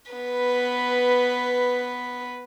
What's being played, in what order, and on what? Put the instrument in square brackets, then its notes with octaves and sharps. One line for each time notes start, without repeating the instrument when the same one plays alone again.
[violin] B3 B4